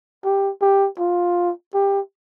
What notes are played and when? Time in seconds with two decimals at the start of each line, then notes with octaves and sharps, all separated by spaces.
0.25 G4
0.62 G4
0.99 F4
1.74 G4